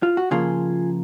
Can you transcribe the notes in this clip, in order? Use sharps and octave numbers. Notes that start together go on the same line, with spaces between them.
F4
F#4
C#3 F3 A#3 F4 G#4